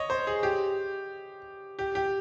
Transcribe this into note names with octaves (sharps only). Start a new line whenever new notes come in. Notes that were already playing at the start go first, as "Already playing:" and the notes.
Already playing: C#5 D#5
C5
G#4
G4
G4
G4